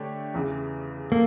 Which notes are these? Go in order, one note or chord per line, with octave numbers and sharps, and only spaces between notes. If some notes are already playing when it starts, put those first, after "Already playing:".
Already playing: D3 A3 D4 G4 C#5
E2 C#3 E3
A#3 A4